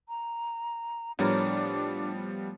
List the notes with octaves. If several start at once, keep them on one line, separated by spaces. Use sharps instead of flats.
A#5
A2 F3 G3 B3 D4 A#4